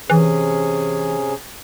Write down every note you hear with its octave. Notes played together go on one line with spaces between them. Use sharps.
C3 E3 C#4 G#4